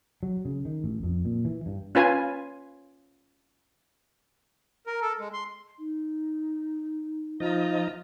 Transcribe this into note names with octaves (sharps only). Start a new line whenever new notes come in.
F#3
C#3
D#3
A1
F2
A#2
E3
G2
C#4 F4 B4 G#5
A#4
A4
G#3
C6
D#4
F3 D#4 F4 D#5